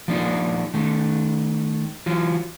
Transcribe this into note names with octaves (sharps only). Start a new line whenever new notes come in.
F3 A#3 D4 D#4 F4
D#3 A3
E3 F#3 F4